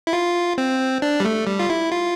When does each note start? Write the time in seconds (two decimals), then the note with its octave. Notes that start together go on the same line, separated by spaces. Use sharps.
0.07 E4
0.13 F4
0.58 C4
1.02 D4
1.20 G3
1.25 A3
1.47 G3
1.59 F4
1.70 E4
1.92 F4